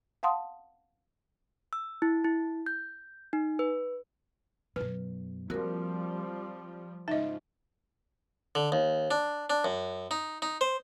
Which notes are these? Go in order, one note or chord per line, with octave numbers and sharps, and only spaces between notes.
F5 F#5 A5 C6 D#6
E6
E4
E4
G6
D#4
B4
F#2 B2 B4
F3 G3 A#3 C4 F#4 A#4
G#2 C#3 F3 D#4 D#5 E5
D3
D#2
D4
D4
F#2
D#4
D#4
C5